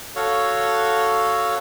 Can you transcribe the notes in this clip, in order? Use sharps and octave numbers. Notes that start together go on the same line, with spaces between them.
F#4 A4 C#5 F5